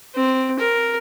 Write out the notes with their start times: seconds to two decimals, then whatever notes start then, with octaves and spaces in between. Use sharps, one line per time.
0.15 C4
0.59 A#4